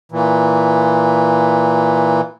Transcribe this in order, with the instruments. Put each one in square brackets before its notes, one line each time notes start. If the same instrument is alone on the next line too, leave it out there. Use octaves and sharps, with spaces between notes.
[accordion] A#2 E3